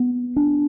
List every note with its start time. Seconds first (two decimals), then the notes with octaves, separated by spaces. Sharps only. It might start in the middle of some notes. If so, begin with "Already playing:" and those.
Already playing: B3
0.36 D4